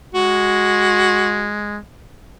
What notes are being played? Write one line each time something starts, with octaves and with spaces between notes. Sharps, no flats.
G#3 F#4